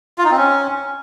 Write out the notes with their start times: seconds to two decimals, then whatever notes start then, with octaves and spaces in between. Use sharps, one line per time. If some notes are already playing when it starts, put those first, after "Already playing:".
0.18 F4
0.25 D#4
0.31 C4
0.37 C#4